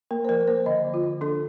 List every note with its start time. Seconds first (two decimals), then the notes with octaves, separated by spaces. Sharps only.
0.11 A#3 A#4
0.25 C5
0.29 F3 A#4
0.47 A#3 C5
0.66 D3 D#5
0.85 F3
0.94 F4
1.03 D3
1.21 D4 A4